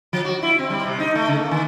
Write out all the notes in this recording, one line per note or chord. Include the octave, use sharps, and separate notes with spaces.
F3
F#4
E4
C4
G3
C3
D#4
A3
C#3
A#3
D#3